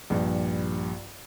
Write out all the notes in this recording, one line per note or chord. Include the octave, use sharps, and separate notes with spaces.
A#1 G2